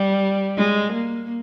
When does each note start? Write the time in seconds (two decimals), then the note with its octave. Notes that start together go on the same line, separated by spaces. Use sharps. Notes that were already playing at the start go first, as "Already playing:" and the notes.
Already playing: G3
0.57 G#3
0.93 A#3